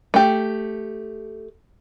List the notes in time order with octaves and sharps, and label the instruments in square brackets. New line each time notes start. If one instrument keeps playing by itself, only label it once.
[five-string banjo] A3 G4